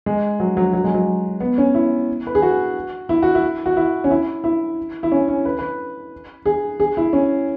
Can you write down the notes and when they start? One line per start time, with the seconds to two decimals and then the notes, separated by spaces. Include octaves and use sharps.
0.06 G#3
0.40 F#3
0.57 F#3
0.73 F#3
0.84 G#3
0.94 F#3
1.40 B3
1.58 C#4
1.74 E4
2.27 B4
2.35 G#4
2.42 F#4
3.09 E4
3.23 F#4
3.35 E4
3.66 F#4
3.77 E4
4.04 C#4
4.11 E4
4.44 E4
5.03 E4
5.12 C#4
5.28 C#4
5.45 B4
5.59 B4
6.46 G#4
6.80 G#4
6.97 E4
7.13 C#4